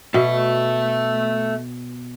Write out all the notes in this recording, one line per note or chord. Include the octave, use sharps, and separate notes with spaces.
B2 A4 E5